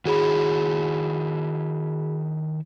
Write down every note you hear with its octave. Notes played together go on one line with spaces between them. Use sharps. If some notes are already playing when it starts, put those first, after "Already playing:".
D#3 E4 F#4 G#4 C#5 B5